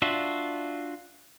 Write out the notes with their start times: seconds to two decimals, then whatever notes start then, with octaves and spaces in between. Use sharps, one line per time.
0.02 D4 F4 F#4 E5